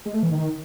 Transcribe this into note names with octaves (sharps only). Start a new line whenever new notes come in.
G#3
A3
E3
D#3